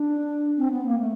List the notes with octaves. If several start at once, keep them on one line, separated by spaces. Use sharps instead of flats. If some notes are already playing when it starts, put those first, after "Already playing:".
Already playing: D4
C4
B3
A#3
A3